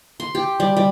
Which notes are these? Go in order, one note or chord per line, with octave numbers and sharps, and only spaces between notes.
C6
G4
G3
G3